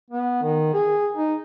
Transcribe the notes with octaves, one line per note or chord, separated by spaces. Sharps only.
B3
D#3
G#4
D#4